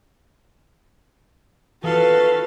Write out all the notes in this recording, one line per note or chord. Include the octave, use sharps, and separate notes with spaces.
E3 F4 F#4 A4 B4 F5